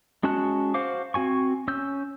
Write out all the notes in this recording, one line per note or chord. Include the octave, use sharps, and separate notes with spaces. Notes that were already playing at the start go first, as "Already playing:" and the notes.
G#3 C#4 F#4 A5 F#6
F#4 C5 F5 D6
C4 F#4 G#5 C#6
C#4 E6 G6